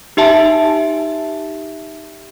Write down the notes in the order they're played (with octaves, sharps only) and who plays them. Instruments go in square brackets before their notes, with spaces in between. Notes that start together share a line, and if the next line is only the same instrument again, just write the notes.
[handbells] D#4 G4 E5 A5